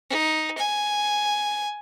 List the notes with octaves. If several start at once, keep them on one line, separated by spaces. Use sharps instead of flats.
D#4
G#5